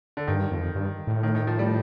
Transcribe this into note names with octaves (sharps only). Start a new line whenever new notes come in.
D3
G2 D#3
F2
G2
A2
D#3
D#3
F3
G3